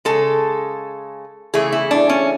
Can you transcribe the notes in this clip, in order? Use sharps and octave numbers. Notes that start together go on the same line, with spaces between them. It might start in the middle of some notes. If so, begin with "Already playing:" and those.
C#3 G#3 A4
C#3 E3 A3 G#4
E4
D4
C#4